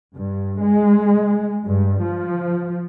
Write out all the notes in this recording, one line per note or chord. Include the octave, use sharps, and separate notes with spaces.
G2
G#3
G2
F3